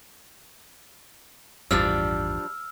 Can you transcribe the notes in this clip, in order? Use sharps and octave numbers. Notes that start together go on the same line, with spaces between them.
A1 E2 G2 F3 G3 D4 E6 F6